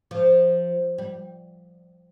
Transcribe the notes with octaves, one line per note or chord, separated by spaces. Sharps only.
F3
G3